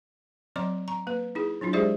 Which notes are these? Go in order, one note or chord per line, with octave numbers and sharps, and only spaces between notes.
F#3 C4 D5 D#5 A#5 D6
A#5 C#6
A#3 B4
D#4 E4 G#4
F#3 D4 E4 F4
G#3 G4 G#4 C5 D5 E5